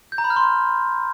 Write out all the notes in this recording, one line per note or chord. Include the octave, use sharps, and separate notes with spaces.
G6
A#5
B5
F6
C6